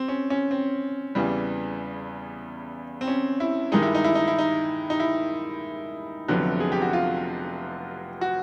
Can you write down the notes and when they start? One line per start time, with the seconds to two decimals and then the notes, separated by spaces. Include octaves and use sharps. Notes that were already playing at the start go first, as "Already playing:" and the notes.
Already playing: C4
0.08 C#4
0.30 C#4
0.51 C4
1.15 E2 C#3 E3 G3
3.01 C4
3.08 C#4
3.40 E4
3.72 G2 D#3 G#3 D#4
3.83 E4
3.95 D#4
4.04 E4
4.15 D#4
4.28 E4
4.39 D#4
4.90 D#4
5.00 E4
6.28 F1 F2 D3 F#3 B3
6.60 G#4
6.72 G4
6.82 F#4
6.93 F4
8.21 F#4